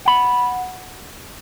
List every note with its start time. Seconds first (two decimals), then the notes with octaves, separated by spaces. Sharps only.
0.05 F#5 B5